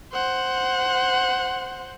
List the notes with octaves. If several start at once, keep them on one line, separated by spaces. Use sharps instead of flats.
C5 F#5